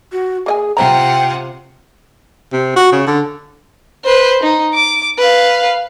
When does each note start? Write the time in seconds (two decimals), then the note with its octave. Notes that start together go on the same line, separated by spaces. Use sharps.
0.12 F#4
0.46 A#3 G#4 D#5 G#5
0.77 C3 E4 F4 C5 F#5 G5 A#5
2.52 C3
2.76 F#4
2.92 C#3
3.07 D3
4.05 B4 C5
4.43 D#4
4.74 D6
5.18 B4 F5